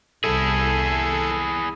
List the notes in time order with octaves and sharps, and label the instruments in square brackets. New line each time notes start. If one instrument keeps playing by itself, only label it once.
[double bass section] C2 [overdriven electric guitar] E4 G#4 [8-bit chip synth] A4